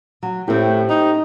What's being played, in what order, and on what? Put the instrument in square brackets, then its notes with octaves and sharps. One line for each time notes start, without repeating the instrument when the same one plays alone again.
[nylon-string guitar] F#3
[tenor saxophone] A2 [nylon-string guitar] C4 G4
[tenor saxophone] D#4